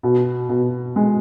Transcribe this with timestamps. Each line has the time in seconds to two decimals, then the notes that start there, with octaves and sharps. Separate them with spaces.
0.03 B2
0.49 B2
0.96 G#3